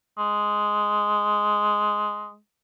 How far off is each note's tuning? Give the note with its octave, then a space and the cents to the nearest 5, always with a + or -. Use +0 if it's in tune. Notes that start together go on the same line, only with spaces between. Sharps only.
G#3 +5